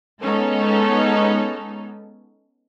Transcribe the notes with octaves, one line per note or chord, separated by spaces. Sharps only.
G#3 B3 C#4 D#4 A4